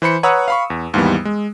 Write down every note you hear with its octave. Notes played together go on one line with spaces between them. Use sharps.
E3 C5 B5 C#7
B4 C#5 F#5 A#5 D#6 E6
F5 B5 C#6
E2
D#2 G#2 E3 G3 B3
G#3